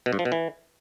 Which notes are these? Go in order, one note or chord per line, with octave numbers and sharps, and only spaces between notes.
B2
G2
F3
B2
E3